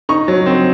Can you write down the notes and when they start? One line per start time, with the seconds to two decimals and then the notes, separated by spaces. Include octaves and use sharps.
0.09 D#4 C#6
0.28 F#3
0.46 C4